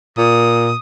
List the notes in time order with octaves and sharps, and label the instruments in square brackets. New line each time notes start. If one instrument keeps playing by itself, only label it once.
[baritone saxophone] A#2 [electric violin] D#6